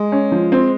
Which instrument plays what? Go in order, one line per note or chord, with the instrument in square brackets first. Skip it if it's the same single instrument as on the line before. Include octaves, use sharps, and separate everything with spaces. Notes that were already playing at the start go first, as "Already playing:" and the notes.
Already playing: [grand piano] G#3
[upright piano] C#4
F3
C4